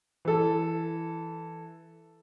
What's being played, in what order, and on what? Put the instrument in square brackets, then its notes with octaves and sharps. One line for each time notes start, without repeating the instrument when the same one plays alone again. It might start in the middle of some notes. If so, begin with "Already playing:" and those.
[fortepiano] E3 A4